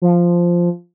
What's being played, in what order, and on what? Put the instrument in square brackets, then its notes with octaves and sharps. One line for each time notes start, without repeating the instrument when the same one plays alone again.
[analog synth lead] F3